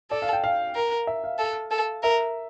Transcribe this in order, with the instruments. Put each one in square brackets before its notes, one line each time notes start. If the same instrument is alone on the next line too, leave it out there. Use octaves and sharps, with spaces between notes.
[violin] A4 [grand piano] D5
[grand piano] F5
G5
F5
[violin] A#4
[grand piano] E5
F5
[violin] A4
A4
[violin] A#4 [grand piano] E5